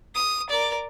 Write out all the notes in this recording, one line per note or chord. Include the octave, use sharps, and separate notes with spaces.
D#6
A#4 D5